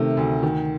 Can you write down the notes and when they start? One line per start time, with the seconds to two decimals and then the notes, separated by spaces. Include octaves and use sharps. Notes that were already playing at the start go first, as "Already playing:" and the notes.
Already playing: C3 D#3 A3
0.17 D2
0.43 D#3